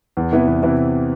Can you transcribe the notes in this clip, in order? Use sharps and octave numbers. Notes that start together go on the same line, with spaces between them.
E2
C3 E3 B3 E4
E2
C3 E3 B3 E4